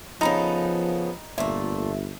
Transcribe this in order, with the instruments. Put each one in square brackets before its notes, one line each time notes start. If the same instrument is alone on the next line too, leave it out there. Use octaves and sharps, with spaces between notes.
[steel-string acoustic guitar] C#3 B3 A4 [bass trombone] F3 [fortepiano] D#4 A#5 [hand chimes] B5
[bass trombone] G1 [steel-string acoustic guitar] A#2 A3 [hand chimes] E5